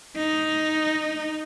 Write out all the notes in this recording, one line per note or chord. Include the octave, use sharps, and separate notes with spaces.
D#4